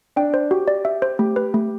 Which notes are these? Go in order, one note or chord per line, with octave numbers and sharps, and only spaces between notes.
D4 G5
C5
F#4 G4
D5
E5
C5
A3 G4
B4
A3